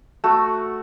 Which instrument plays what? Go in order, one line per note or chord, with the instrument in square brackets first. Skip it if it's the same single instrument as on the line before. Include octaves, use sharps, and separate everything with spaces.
[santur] A3 F#4